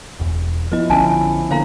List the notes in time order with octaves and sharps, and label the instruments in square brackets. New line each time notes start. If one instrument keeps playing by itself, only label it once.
[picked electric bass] E1 E2
[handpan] F3 B3 E4 [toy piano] B4 D#5
[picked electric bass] A#1 D3 C#4 [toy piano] G#5 A5
[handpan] D3 A#3 B3 [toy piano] C5 F5 A#5